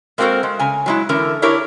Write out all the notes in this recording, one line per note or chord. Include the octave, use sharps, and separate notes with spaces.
G#3 A#3 C4 F#4 A4 A#4
G#3
C#3 G#5
F#3 G#3 E4
D3 E3 C#4 A#4
D4 E4 G4 A#4 C#5